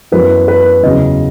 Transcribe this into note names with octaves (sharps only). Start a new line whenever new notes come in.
F#2 E3 B3 B4
B4
E2 C#3 F#3 D#5